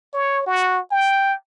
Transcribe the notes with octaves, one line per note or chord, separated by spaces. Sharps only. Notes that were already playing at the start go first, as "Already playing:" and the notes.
C#5
F#4
G5